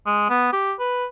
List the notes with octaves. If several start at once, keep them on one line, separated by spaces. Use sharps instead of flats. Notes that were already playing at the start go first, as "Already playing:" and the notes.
G#3
B3
G4
B4